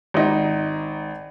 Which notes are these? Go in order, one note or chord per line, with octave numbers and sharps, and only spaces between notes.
G#1 D#4